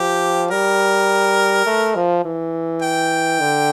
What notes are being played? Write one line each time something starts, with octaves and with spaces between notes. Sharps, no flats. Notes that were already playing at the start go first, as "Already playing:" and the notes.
Already playing: F3 G4
G3 A#4
A3
F3
E3
G5
D3